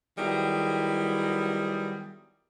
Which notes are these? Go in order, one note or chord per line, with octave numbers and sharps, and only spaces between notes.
D#3 F#3 G3 B3 E4 G#4